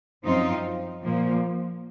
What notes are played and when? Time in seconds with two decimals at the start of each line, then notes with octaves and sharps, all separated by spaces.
0.25 F#2 F3 C4 D#4 F4
1.04 A#2 F3 A#3